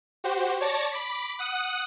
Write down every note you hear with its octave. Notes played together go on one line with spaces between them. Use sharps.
F#4 G4 C5
C#5 D5 A5 C#6 A6 A#6
B5 D6 B6
F#5 D#6 F#6